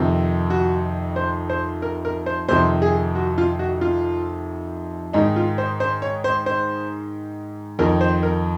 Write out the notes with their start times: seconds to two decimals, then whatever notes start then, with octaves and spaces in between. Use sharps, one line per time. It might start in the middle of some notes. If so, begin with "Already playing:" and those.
Already playing: F2 C3 D#3
0.50 F#4
1.16 C5
1.50 C5
1.82 A#4
2.05 A#4
2.26 C5
2.49 F2 C3 D#3 C5
2.82 G#4
3.15 F#4
3.38 F4
3.59 F#4
3.81 F4
5.13 G#2 D#3 D#4
5.36 F4
5.58 C5
5.80 C5
6.02 C#5
6.24 C5
6.46 C5
7.79 F2 D#3 A#4
8.01 C5
8.23 A#4